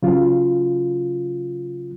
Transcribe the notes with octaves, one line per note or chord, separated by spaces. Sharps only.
C#3 F#3 F4